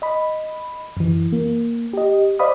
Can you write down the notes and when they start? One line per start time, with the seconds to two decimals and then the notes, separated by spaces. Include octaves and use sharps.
0.02 D#5 B5
0.97 F#2 E3
1.33 A#3
1.93 G4 D#5
2.39 C5 D5 D#5 F5 B5 D#6